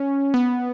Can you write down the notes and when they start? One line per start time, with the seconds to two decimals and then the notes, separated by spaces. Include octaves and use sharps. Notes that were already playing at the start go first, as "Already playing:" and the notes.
Already playing: C#4
0.34 B3